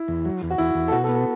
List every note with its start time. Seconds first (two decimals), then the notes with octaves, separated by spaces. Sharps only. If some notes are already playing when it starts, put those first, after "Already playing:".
Already playing: E4
0.08 E2
0.25 F#3
0.43 E2
0.50 F#4
0.58 E2 E4
0.75 E2
0.88 A4
0.92 B2 F#4
1.04 A4
1.09 B3
1.15 A4